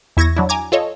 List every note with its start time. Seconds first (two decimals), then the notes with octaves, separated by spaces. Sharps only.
0.17 E2 E4 C#6 G#6 A#6
0.37 F#3 D4 E4
0.49 G#5 A#5 D6 G#6
0.72 F4 A4 C#5 D#5